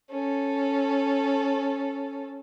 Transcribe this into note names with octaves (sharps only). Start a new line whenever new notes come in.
C#4 A4